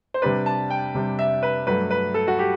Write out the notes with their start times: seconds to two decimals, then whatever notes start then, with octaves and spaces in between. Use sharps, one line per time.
0.14 C5
0.22 C3 G3 D4 B4
0.46 A5
0.70 G5
0.94 C3 G3 D4
1.19 E5
1.43 B4
1.67 G2 F#3 A3 B4
1.90 B4
2.14 A4
2.28 F#4
2.39 G4